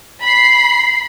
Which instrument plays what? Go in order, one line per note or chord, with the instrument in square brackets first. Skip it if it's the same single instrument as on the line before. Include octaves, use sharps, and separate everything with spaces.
[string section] B5 C7